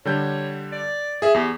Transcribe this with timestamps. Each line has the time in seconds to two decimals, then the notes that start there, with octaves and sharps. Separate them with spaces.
0.05 D3 G3 C#5 G6
0.72 D5
1.22 G#4 E5
1.34 E2 G4